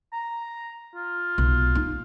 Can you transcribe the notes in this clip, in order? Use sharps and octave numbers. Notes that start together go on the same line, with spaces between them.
A#5
F4
B1
D#4